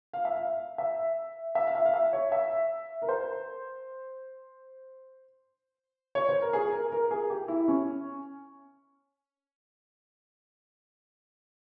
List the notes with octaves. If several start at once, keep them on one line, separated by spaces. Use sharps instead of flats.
F5
E5
F5
E5
E5
F5
E5
F5
E5
C#5
E5
A#4
C5
C#5
C5
A#4
G#4
A#4
A#4
G#4
G4
E4
C#4